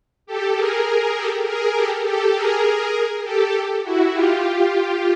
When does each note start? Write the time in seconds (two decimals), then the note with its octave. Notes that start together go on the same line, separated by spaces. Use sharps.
0.26 G4 A4
0.56 G#4 A#4
1.16 G4 A4
1.46 G#4 A#4
1.76 G4 A4
2.05 G4 A4
2.35 G#4 A#4
3.24 G4 A4
3.84 E4 F#4
4.13 F4 G4
4.73 F4 G4